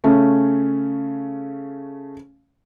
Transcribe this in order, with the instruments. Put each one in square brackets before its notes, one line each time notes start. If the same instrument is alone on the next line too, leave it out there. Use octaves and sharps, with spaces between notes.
[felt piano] C#3 A3 C#4